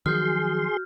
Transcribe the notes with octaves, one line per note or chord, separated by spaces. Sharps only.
D#3 F3 F#3 F#4 G#4 C6 F6 G6